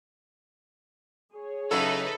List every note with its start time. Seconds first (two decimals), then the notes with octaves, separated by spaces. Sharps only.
1.33 G#4 C#5
1.71 C#3 F#3 D#4 E4 A4 B4